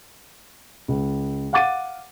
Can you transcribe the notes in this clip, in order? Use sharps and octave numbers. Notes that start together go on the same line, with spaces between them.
C#2
F5 F#5 D6 A6 D#7